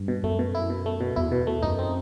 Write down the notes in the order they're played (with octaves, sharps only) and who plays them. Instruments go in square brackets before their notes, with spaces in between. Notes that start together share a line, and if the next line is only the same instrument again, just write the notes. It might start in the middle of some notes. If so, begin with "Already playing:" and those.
Already playing: [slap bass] G2
[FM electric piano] B2
[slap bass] F#2 [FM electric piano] A3
[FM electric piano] B2
E4
B2
A3
B2
[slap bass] E2 [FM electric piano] E4
[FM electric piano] B2
A3
[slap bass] F#2 [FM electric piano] D#4
[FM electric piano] C4